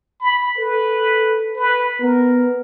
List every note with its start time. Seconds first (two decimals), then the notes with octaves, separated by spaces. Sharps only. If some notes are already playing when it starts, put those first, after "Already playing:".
0.20 B5
0.58 A4 B4
1.56 B4
2.01 B3 A#4